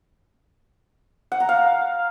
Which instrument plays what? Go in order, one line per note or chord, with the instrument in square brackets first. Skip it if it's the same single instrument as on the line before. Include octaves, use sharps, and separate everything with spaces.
[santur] F#5
A#5
F5